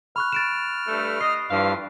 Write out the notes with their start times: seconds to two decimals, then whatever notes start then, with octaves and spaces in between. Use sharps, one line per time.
0.16 B5 C#6 F6 F#6
0.32 A6 D7 E7
0.87 G2 A3
1.21 D#5 C7
1.51 G2 E3 F3 F5